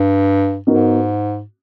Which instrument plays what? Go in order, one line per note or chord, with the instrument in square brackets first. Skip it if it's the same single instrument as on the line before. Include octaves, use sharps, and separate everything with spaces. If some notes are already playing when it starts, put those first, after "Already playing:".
Already playing: [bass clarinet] G2
[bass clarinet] G#2 [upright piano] B3 D#4 F#4 A#4